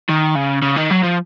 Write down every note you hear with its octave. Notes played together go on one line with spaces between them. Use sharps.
D#3
C#3
C#3
D#3
F#3
F3